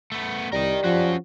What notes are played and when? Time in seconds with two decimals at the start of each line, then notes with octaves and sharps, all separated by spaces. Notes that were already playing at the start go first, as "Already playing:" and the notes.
0.12 A3 B3
0.52 C2 G3 A#4 D#5
0.84 F3 C#4 F#4